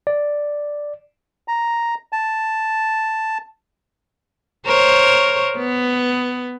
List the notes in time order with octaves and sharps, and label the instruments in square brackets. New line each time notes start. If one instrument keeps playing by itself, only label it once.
[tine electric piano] D5
[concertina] A#5
A5
[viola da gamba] A#4 C5 C#5
B3